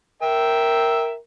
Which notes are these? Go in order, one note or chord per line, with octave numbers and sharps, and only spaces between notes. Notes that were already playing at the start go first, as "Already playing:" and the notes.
A#4 E5 G5